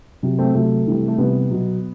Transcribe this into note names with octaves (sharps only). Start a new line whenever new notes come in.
C3 F#3
A3 C4
C3 F#3 A3
C3 E3 G3
A3
C3 E3 G3 B3
B2 F#3